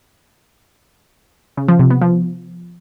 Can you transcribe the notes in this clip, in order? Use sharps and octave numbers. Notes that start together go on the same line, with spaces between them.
C#3
F3
C3
B3
F3